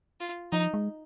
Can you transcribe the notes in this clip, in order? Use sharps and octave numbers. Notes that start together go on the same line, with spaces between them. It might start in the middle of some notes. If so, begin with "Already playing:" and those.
F4
F3 D#4
G#3